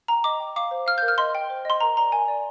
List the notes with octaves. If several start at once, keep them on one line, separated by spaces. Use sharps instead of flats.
G5 A#5
D#5 D6
G5
F5 D6
C5
F5 F6
A#4 G6
F6
D#5 C6
G5
C5
D#5 C6
A#4 A#5
D5 A#5
A#4 G#5
D5